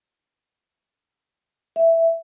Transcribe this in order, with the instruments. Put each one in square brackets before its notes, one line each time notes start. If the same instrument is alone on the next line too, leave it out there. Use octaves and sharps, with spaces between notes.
[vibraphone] E5